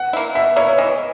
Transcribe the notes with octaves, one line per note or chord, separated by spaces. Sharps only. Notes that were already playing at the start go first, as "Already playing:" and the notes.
Already playing: F#5
A#3 E4
B2 E5
A#3 E4 C#5
E3 D#5